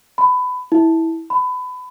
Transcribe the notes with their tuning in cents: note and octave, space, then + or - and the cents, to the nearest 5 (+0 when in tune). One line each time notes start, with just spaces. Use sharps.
B5 +20
E4 -15
B5 +25